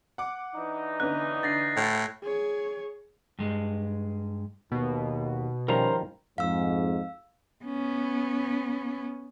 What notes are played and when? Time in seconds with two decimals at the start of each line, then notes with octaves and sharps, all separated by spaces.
0.18 F#5 D6
0.55 E3 D4 D#4
1.00 D3 B3 C#4 F#6
1.43 D3 A6 A#6 C7
1.77 A2
2.22 G#4 C#5
3.39 G2 G#3
4.72 D#2 B2
5.68 D#3 F3 G3 C#4 A#4 C5 A#5
6.38 F2 G#2 F5 E6
7.65 B3 C#4